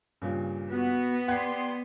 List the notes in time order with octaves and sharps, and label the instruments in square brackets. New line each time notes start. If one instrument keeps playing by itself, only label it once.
[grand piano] G2 A#2 C#3
[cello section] B3 [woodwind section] F#4
[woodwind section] G4 D5 C6 [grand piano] F#5 G#6